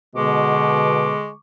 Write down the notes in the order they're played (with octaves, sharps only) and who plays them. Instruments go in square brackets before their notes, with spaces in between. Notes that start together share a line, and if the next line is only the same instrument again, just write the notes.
[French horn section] B2 [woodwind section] D3 C#6 D6 [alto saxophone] G#3